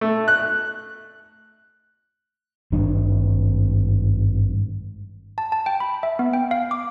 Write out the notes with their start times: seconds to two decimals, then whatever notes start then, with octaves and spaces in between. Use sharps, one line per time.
0.01 A3
0.28 F#6
2.72 G#1 G2 D4
5.38 A5
5.52 A5
5.66 G5
5.80 B5
6.03 E5
6.19 B3
6.33 G5
6.51 F5
6.71 D6